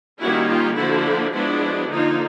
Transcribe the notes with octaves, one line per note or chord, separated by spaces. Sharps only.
D#3 G3 A#3 C#4 E4 F#4
F4 G4
D3 F3 A#3 D4 E4 F#4
F3 G#3 B3 D4 E4 F#4
D3 F3 A#3 D#4 F4